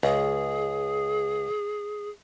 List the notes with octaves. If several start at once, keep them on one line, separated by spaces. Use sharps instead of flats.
C#2 G#4